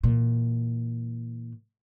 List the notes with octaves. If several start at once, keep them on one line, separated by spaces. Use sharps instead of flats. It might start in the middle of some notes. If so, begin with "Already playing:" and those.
A#2 E3